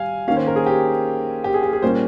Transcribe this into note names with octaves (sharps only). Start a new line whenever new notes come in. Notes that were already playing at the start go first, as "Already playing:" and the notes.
Already playing: G3 F5 G#5
D#3 A#3 C#4 F5
C5
A#4
G#4
G4
G4
G#4
G4
G#4
A#2 G3 A#3 C#4 C5